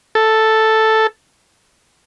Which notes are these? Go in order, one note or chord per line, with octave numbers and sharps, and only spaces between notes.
A4